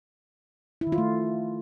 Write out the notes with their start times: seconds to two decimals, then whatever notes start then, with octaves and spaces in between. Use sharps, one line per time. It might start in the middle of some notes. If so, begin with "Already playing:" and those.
0.81 E4
0.87 D#3
0.92 F4
0.98 A3